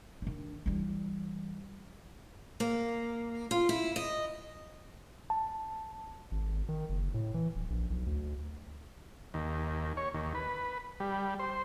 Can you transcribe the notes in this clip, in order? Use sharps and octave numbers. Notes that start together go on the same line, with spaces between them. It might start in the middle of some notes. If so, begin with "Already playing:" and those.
D#3 D4
E3 G3
A#3
F4
E4
D#5
A5
G#1
D#3
F#1
A2
E3
D1
A#1
B1
D2
D#2
C#5
D#2
B4
G3
C5